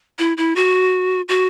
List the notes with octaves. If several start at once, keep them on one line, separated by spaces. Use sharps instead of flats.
E4
E4
F#4
F#4